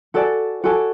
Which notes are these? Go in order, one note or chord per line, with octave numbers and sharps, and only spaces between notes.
F#4 A4 D5 G#5
F#4 A4 D5 G#5